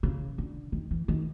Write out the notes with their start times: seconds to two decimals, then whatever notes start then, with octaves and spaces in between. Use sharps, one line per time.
0.03 C#3
0.38 D3
0.72 D#3
0.91 E3
1.08 D#3